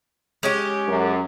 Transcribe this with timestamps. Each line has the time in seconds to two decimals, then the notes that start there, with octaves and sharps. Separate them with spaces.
0.43 G#3 C#4 G4
0.88 F#2